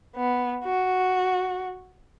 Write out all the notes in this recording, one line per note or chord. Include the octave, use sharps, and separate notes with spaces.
B3
F#4